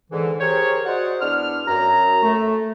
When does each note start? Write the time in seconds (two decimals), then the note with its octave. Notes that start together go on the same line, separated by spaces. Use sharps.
0.11 G#2 D3 E3
0.40 G4 G#4 A#4 C5 C#5
0.86 F#4 G#4 C5 D5 D#5 F#5
1.20 E2 B3 D4 F6
1.67 F#2 A#5
2.23 A3